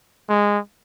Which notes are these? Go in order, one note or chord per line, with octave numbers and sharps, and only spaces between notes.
G#3